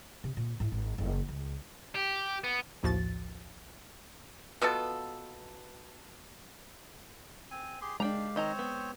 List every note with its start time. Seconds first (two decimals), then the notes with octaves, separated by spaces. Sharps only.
0.24 C3
0.37 A#2
0.60 G#2 E4
0.72 G#1
0.98 F#1 E3
1.29 C#2
1.95 G4
2.44 B3
2.83 A#1 D#2 A2 F3 F#4 A6
4.61 B2 B3 F4 A4
7.51 C4 G#5
7.81 G4 G#4 C6
8.00 G#3 D4 G4 F5 G5 A#5
8.36 D#3 C4 C5 C#5 D#5 A#5
8.59 B3